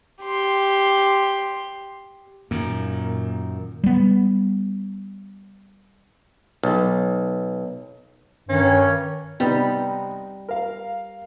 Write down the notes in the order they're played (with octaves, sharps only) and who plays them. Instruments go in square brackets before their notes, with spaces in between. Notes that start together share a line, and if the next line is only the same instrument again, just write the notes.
[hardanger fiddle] G4 C6
[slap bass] F#2 D#3 [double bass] A#2 [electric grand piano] A#3
[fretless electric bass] G3 B3
[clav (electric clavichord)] B1
[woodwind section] G2 D#3 [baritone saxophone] C#4
[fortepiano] C3 B3 D#4 [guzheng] G3
[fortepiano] A#4 F5